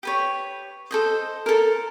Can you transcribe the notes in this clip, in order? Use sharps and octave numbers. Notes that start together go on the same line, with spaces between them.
G4 B4 C#5
A4 C5 D#5
A4 A#4